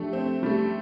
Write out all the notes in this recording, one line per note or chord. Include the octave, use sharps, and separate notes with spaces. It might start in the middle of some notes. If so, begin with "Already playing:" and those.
Already playing: F3 A3 D4 G4
C4
G3
A3